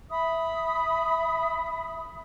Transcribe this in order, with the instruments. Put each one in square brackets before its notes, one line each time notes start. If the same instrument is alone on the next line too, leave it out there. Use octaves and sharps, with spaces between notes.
[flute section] E5 B5 D#6